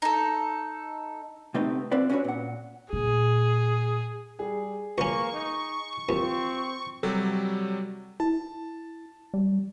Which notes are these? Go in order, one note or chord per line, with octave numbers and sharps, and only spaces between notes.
D#4 A4
C3 A3 C4 D#4 B4 D#5
C4 F4 B4 D5
C#4 D4 F#4 A#4 B4 C#5
A#2 F#5
A#2 G#4
G3 G#4
C#2 A#3 C#4 C#6
D#4
D#2 C4 F4
C3 F#3 G3 A4
E4 A5
G3